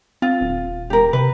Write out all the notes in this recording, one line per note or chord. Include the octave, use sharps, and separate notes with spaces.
C4 F4
D#1
E1 G4 A#4
C3 B4